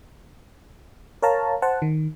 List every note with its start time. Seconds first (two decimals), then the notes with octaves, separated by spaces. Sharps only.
1.22 A#4 C#5 F5 A5 A#5
1.62 C5 F#5 A5
1.82 D#3